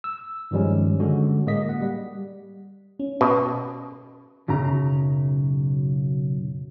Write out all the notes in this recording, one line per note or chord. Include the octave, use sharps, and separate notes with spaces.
E6
G2 D#3 F3 G3 G#3 C#4
D3 G#3 C#4 F#4
A2 G#3 A#3 D#5 B6
F#5
G3
C#4
B2
B1 F#2 C#3 A#5